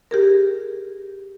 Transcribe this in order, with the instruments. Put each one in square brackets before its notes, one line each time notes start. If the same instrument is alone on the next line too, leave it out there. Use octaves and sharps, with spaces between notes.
[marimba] G4 G#4 A#4